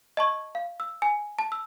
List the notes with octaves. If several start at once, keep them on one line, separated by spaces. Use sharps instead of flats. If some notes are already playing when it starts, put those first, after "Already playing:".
D#5 A5 C#6 G#6
F5
E6
G#5
A5
E6